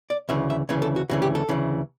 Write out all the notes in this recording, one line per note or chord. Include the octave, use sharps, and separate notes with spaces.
D5
D2 C#3 E3 E5
E5
D2 C#3 E3 C#5
A4
F#4
D2 C#3 E3 F#4
G4
A4
D2 C#3 E3